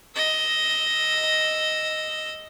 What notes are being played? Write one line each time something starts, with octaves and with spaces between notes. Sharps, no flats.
D#5 E6